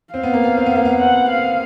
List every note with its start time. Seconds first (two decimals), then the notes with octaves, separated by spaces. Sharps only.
0.14 C4 F5
0.23 B3
0.33 A#3
0.44 B3
0.57 C4
0.66 B3
0.76 A#3
0.85 B3
1.00 C4 F#5
1.29 F5